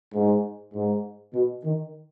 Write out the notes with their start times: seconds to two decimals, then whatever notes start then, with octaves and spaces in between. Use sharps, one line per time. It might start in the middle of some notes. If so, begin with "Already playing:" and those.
0.15 G#2
0.74 G#2
1.33 B2
1.64 D#3